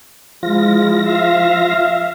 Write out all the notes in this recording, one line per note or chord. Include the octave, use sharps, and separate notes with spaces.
F3 G#3 E4 F4 A#6
E5 F5